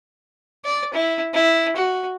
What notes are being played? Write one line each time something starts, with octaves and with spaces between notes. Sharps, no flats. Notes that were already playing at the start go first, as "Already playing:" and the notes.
D5
E4
E4
F#4